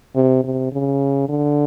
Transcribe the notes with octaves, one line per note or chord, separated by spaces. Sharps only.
C3
C3
C#3
D3